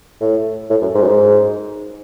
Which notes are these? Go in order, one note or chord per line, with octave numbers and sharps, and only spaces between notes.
A2
A2
F#2
G#2
F#2
G#2